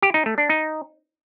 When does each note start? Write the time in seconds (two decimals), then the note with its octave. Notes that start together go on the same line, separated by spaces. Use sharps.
0.02 G4
0.14 D#4
0.26 A3
0.38 D4
0.49 D#4